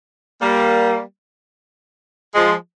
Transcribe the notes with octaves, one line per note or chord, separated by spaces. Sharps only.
G3 A#3
F3 G#3